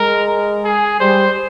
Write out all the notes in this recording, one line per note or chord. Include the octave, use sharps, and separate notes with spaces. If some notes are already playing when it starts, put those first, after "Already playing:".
Already playing: G#3 A#4
G#4
G3 C5